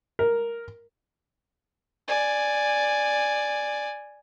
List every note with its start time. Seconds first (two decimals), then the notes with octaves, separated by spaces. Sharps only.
0.19 A#4
2.08 D5 G#5